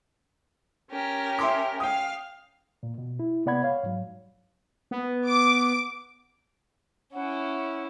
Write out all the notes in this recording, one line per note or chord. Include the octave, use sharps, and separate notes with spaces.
C#4 G4 A#4
E5 C6 D6
F5 G5 D#6
A#2
B2
E4
C3 B3 D5 F#5 B5 G#6
C#5 F5
G#2 F#3
B3
D6
C#4 E4 F#5